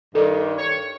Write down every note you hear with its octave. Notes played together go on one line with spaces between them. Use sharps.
G2 D#3 A4
C#5